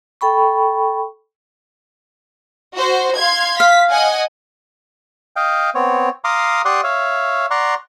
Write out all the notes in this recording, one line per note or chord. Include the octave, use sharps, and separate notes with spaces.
A4 G5 B5 C#6
F#4 C5
F5 C6 G#6
F5 B6
D#5 F#5 G#5
D#5 F5 G5
B3 C4 C#5
F5 A#5 C6 D6 D#6
G4 D5 F#5 C6 C#6 D#6
C#5 E5 F5
D5 F#5 A#5 C6 C#6